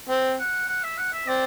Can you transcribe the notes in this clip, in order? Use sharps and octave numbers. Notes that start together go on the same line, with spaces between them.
C4
F#5
F#5
E5
F#5
E5
C4 D5